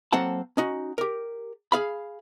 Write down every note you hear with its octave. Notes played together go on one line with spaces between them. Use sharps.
F#3 A#3 C4 A4 F#5 A5
C#4 D#4 F#4
G4 A#4
G#4 F5 B5